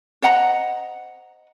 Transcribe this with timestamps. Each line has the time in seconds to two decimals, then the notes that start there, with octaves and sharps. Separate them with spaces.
0.22 C5 D#5 F#5 A#5